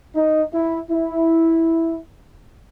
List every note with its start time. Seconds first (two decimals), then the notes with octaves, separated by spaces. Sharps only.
0.15 D#4
0.52 E4
0.90 E4